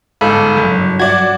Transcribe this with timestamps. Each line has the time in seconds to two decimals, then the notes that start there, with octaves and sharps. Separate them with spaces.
0.21 G1 G#2 A4 F5 B5
0.57 F#1 G2 F#3
1.00 F#4 D5 G#6